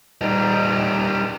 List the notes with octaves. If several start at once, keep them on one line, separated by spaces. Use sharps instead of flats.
G3 D#4